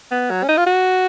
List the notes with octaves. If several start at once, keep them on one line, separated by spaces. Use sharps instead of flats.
B3
F#3
C#4
D#4
F4
F#4